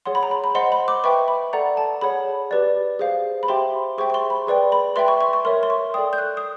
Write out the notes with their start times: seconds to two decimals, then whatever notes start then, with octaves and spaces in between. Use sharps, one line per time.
0.06 G#4 C#5 F#5 C6
0.15 B5
0.23 A#5
0.31 B5
0.44 B5
0.55 C5 D#5 F#5 C6
0.72 B5
0.88 D6
1.04 B4 E5 G5 C#6
1.28 B5
1.53 A4 D5 F#5 A#5
1.77 A5
2.01 G#4 C#5 F#5 B5
2.51 G4 B4 D5
2.99 G#4 C5 F5
3.43 B5
3.48 G4 C5 E5 G5 C6
3.98 G#4 C5 E5 G5 C#6
4.10 C#6
4.14 C6
4.30 B5
4.47 G#4 B4 D5 G5
4.72 B5
4.96 B4 E5 G5 C6
5.08 C#6
5.21 C#6
5.33 C#6
5.45 A#4 C#5 E5 C6
5.63 C6
5.70 C#6
5.94 A4 D5 G5 D#6
6.13 G6
6.18 F#6
6.37 D#6